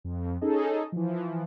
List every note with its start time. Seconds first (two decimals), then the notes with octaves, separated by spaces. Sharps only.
0.05 F2
0.41 C#4 D#4 G#4 A4 D#5
0.92 E3 F3